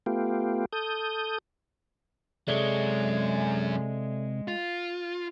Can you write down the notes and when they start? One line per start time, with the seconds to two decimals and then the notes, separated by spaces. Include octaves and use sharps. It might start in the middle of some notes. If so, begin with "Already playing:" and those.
0.06 A3 B3 F4 G4
0.73 A4 D#6 G6
2.48 F#2 C3 G#3 A4 C#5 D5 E5
4.48 F4